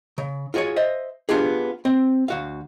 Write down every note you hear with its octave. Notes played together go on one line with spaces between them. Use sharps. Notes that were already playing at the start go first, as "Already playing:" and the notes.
C#3
F4 F#4 G#4 B4 C#5
C5 D#5 E5
B3 D4 F4 G4 G#4
C4
D2 F#4 F5